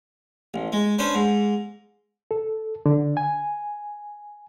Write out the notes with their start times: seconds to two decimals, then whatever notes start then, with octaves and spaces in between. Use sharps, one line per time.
0.54 A1
0.72 G#3
0.99 C#4 D4 B4 C5
1.15 G#2
2.31 A4
2.86 D3
3.17 G#5